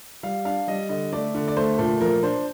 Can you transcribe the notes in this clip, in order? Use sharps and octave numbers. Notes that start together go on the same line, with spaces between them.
G3 F5
D4 F5
G3 D#5
D3 D#5
A3 D5
D3
D5
A3 C5
A#2 A4
F3 A#4
D4 C5